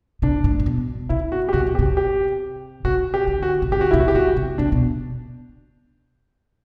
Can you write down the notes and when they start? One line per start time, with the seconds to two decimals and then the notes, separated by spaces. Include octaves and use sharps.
0.22 C3 D4
0.44 A2
0.60 A2
0.66 B2
1.09 C3 E4
1.32 F#4
1.49 G4
1.53 C3 F#4
1.67 B2
1.75 G4
1.79 C3
1.97 G4
2.85 C3 F#4
3.14 G4
3.27 D3
3.43 F#4
3.62 C3
3.72 D3 G4
3.81 F#4
3.91 C3 E4
4.00 F#4
4.08 G4
4.15 C3 F#4
4.37 C3
4.58 C3 D4
4.72 B2